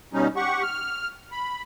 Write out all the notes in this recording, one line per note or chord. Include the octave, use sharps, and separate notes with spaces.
B2 G3 C#4 D#4
G4 F#5 C#6
F6
B5